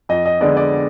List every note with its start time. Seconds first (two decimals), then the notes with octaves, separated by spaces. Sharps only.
0.09 F2 D#5
0.26 D#5
0.41 D3 G#3 B3 D5
0.57 D5